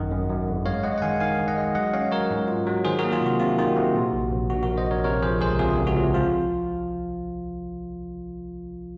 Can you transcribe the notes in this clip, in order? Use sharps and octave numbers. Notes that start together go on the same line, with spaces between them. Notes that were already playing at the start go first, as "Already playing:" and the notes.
Already playing: G#1 F#2 D#3 D#5 F#5
F#2
F#2
G#1
G#3 C#5 F5
G#3 D#5 F#5
F#5
D#3 F5 G#5
D#3 F5 G#5
D#3
D#5 F#5
G#3
F#3 D#5 F#5
C#4 C#5 F5
F#3 A#4 C#5
G#2
F4
F#3
D#3 G#4 C5
A#3 F#4 A#4
F4 G#4
C3 F#4
C3 F4
D#3 F4
C3 F#4
A#2
A#1
A#1
A#1 F#4
F#4 A#4
A#1
C5 D#5
A#1 A#4 C#5
C3 A#4 C#5
F3 G#4 C5
C#2 G#4 C5
C3 F4 G#4
C#2
F#4
C3
F3 F4